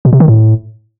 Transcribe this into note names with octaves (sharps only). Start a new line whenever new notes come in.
B2
C3
D#3
A2